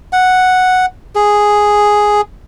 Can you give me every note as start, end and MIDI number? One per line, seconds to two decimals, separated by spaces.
0.13 0.86 78
1.15 2.21 68